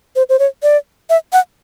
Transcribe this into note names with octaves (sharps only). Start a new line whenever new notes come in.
C5
C5
C#5
D5
E5
F#5